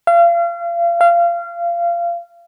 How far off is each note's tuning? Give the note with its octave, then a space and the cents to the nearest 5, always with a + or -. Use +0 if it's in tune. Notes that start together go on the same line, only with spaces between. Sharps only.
F5 -35
F5 -25